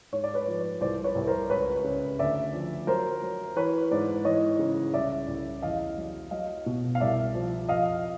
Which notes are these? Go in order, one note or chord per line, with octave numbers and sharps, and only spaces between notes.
G#2 C#5
D5
B4 C#5
F3
C2 C5 D5
B4 C#5
C2
A#4 C5
C#2 B4 C#5
C#3
D2 D5 E5
F3
F#3 A#4 C5
F#3
E3 B4 C#5
G#2 C5 D5
E3 C#5 D#5
C#3
C2 D5 E5
C2
E2 D#5 F5
F#3
F#3 D#5 F5
B2
F5
C2 D5 E5
F3
F2 D#5 F5